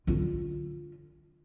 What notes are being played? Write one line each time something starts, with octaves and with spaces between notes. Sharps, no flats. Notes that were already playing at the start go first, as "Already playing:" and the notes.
D3 F4